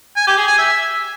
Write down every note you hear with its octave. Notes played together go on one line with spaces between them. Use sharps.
G#5
G4
G#4
G#5
E5